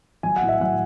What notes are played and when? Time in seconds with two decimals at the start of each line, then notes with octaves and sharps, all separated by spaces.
0.23 F#3 G#5
0.36 F#5
0.42 A2
0.48 E5
0.60 F#3 F#5